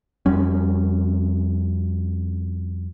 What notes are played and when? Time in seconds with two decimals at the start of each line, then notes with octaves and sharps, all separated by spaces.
0.26 F2 G3 C#4